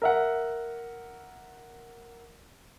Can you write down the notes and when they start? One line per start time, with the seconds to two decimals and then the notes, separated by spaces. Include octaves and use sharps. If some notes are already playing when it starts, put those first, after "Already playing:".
0.02 A#4 E5 F#5